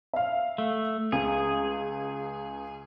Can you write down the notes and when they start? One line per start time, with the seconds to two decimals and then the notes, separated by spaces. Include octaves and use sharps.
0.14 E5 F5
0.58 A3
1.12 C#2 G#4